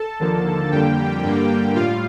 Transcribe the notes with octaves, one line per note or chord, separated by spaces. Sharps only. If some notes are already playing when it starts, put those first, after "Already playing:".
Already playing: A4 A5
D#2 D3 F3 A#3
F2 D3 G3 A#3 G4 G5
G2 D3 G3 A#3
A2 G3 F4 F5